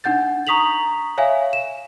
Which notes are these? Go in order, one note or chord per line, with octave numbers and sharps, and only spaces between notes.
D4 D#4 F#5 G6 A6
A#5 C#6 D#6 B6 F7 F#7
C#5 E5 F5 G#5
E7